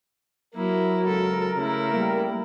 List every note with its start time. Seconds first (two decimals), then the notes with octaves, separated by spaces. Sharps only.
0.55 F#3 A#3 E4 A#4
1.06 C#2 A4
1.56 C#3 A3 E4
1.93 G3 A#3